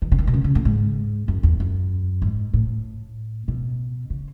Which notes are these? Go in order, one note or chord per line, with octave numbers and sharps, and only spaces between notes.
D#3
C#3
D#3
B2
C#3
C#3
A2
G#2
F#2
E2
F#2
G#2
A2
B2
C#3